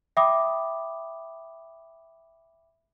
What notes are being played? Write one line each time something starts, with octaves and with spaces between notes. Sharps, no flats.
E5 G5 B5 D6 D#6